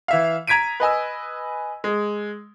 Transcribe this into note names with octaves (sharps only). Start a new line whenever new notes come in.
E3 E5 F5
A#5 G#6 B6 D7 D#7
B4 D#5 G#5 E6
G#3